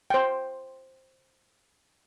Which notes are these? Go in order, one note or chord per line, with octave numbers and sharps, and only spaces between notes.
C5 G5